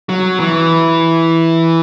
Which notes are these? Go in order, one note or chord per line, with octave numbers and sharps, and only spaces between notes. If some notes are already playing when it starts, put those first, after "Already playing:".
F#3
E3